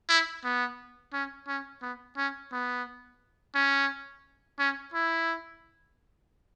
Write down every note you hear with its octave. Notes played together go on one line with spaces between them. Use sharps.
E4
B3
C#4
C#4
B3
C#4
B3
C#4
C#4
E4